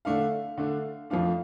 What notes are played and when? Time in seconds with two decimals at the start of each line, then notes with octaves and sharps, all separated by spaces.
0.05 D3 A3 D4 F5
0.57 D3 A3 D4
1.10 F2 F3 A3 D4 F5